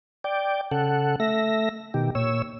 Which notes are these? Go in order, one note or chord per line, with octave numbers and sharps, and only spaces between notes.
D5 G5
C#3 A4 F#5
A3 E5 A#6
B2 D#3 G4
A#2 C#5 E6